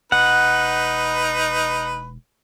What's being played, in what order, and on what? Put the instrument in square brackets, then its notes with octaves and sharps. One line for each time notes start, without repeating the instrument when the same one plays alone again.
[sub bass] E1 [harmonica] D#4 B4 [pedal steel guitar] F#5